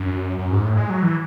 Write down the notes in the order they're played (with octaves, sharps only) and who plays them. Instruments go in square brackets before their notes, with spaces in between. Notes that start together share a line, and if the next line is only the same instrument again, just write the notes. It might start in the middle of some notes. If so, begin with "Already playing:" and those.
Already playing: [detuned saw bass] F#2
F#2
G#2
A2
G#3
F#3
E3